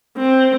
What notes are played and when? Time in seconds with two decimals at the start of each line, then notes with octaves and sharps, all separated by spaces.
0.18 C4